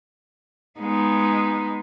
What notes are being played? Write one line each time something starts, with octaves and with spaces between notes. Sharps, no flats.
G#3 B3 D#4